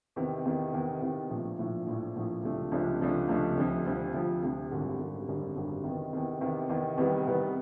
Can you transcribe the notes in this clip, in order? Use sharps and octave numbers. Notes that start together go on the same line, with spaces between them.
E2 C3 D#3
E2 C3 D#3
E2 C3 D#3
E2 C3 D#3
A#1 A2 F3
A#1 A2 F3
A#1 A2 F3
A#1 A2 F3
C#2 C3 F3 A3 D4
C#2 C3 F3 A3 D4
C#2 C3 F3 A3 D4
C#2 C3 F3 A3 D4
D2 C3 F3
D2 C3 F3
D2 C3 F3
D2 C3 F3
G#1 F#2 D3 G3
G#1 F#2 D3 G3
G#1 F#2 D3 G3
G#1 F#2 D3 G3
E2 C3 D#3
E2 C3 D#3
E2 C3 D#3
E2 C3 D#3
E2 C3 D#3 G3 B3
E2 C3 D#3 G3 B3